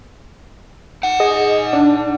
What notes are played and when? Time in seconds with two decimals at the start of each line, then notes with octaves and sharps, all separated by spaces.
1.03 D#4 F#5
1.20 G#4 D#5
1.73 D4